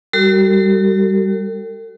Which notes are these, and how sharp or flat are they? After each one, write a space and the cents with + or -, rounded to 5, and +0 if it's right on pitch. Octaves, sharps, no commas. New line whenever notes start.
G3 +0 F#4 +40 A4 +45